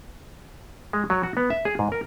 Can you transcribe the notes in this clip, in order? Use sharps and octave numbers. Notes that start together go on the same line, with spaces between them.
G#3
F#3
F#4
B3
E5
G#4
G#2
A#4